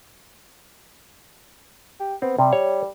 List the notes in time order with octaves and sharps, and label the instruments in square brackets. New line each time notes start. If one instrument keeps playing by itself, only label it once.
[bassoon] G4
[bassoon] B3 [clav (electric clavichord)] C4
[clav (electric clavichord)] C3 [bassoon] G3
[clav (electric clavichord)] C#5